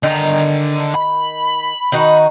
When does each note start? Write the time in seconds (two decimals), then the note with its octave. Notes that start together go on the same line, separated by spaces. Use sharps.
0.03 D3 D#3 A#5
0.95 B5
1.92 D#3 D#4 F#4